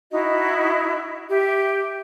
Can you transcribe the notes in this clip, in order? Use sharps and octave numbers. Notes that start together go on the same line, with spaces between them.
D#4 E4 F#4 D#5
G4 E5